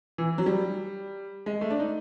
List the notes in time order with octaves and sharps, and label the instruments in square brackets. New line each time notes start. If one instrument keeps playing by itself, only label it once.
[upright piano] E3
F#3
G3
G#3
A3
D4
D#4